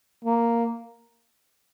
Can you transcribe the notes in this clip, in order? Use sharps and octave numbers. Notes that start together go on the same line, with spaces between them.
A#3